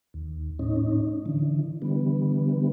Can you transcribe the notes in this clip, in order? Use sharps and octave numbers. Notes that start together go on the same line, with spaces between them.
D#2
A2 C#4 D#4
D3 E3
D3 E3 G3 B3